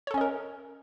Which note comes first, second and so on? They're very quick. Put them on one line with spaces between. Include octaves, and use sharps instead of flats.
C#5 A4 C#4 D#5 A#4